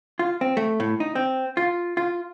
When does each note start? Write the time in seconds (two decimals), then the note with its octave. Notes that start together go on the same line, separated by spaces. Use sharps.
0.19 F4
0.41 C4
0.57 A3
0.80 A2
1.00 D#4
1.15 C4
1.57 F4
1.97 F4